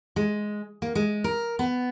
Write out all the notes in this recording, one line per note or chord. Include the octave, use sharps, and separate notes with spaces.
G#3
A#3
G#3
A#4
B3